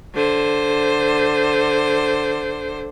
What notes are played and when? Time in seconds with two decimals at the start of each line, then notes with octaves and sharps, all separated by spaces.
0.14 D3 C5